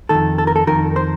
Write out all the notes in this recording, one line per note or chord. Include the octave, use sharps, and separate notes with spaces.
F2 D#3 A4
A4
A#4
A4
F2 D#3 A#4
C5